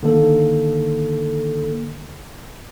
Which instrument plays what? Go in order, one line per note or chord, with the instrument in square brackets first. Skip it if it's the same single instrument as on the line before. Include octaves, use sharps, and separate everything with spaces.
[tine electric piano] D3 D#3 A#3 A4